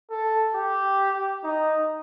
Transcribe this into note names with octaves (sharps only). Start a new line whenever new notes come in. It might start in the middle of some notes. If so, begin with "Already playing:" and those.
A4
G4
D#4